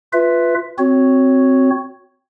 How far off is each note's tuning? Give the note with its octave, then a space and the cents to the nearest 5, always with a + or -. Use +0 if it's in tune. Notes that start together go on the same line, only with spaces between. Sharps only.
F4 +0 B4 +5 E5 +0
C4 +0 F#4 +0 C#5 +0